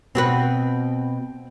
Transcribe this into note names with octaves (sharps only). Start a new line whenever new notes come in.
B2 C4 F#4 B4